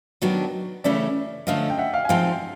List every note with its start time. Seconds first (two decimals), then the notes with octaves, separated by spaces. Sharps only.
0.22 D#3 F#3 B3 D4
0.84 C#3 E3 A3 C#4 E4 D5 E5
1.47 D3 F3 A3 C#4 D#5 F5
1.70 G5
1.78 E5 F#5
1.94 F5 G5
2.05 G#5
2.09 F3 G#3 C4 D#4 F5 G5